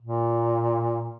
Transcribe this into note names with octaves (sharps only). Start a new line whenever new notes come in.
A#2